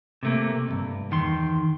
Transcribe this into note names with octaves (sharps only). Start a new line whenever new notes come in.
C3 A3 A#3
B1 G2
E2 D#3 C6